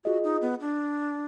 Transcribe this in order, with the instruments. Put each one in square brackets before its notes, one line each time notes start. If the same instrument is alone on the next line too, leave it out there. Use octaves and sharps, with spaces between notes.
[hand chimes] F4 G#4 D#5 [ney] F#4
[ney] D#4
B3
D4